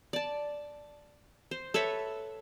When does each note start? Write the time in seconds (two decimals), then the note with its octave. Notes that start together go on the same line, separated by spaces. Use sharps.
0.13 D5 A5
1.51 C5
1.74 A4 B4 C#5 E5